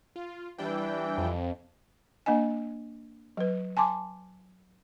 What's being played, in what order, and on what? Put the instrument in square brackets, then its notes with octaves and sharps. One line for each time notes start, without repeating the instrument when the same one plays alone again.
[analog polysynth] F4
[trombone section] E3 [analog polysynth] G3 D4 G5
[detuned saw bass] F2
[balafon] A#3 D4 D#5 G#5
F#3 B4
G#5 A5 C6 D6